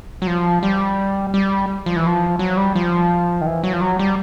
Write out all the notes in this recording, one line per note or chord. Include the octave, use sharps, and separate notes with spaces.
F#3
F3
G3
G3
F3
E3
F3
F#3
G3
F3
D#3
E3
F#3
F3
F#3
G3